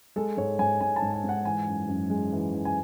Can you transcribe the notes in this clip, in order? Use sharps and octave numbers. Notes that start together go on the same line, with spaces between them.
G#3 A4
G#2 C#5
G#2 G#5
G#2 G#5
A5
G#2
G#5
G#2
F#5
E3 G#5
F#2
F#2
G#3
E3
E3
G#5